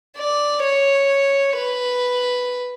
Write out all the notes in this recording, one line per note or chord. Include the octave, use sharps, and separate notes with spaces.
D5
C#5
B4